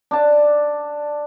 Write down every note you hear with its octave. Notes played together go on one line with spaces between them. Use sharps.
D4 A5